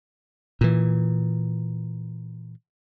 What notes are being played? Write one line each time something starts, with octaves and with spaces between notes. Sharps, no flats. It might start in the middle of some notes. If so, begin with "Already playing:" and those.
A#2 E3